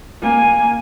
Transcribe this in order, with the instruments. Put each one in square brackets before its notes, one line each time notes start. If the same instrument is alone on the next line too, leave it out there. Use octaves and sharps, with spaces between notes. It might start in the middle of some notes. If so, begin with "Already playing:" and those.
[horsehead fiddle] A#3 G#5